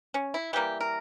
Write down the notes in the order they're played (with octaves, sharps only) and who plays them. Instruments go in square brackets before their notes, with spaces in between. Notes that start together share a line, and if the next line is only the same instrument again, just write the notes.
[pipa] C#4
E4
E3 G3 A#3 G4
A#4